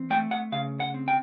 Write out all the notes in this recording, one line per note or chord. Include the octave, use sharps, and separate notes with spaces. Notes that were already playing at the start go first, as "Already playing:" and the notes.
Already playing: E3 C4
A3 G5
F#5
C#3 F5
F#5
C4
G5